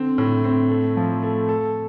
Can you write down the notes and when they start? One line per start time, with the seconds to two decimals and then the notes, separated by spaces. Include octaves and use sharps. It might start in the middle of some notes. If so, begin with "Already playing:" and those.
Already playing: D3 C4
0.18 A2
0.44 C4
0.70 A3
0.97 F3
1.23 A3
1.49 A4